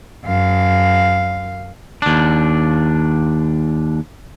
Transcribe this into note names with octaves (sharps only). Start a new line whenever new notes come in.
F#2 F5
D#2 D4